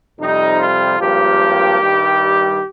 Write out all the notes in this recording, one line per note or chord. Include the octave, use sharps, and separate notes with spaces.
F2 C3 G3 D#4
F4
G#1 G2 F3 A#3 G4
G2 D#3 G3